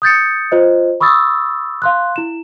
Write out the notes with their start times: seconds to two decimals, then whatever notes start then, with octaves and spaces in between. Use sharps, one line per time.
0.02 D#6 G6 A6 C#7
0.52 F4 C5 D#5
1.00 B5 C#6 D#6 E6 A6
1.82 F5 C6 F#6
2.16 E4 E7